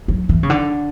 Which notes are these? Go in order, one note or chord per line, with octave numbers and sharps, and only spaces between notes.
F#3
E3
C#3
D3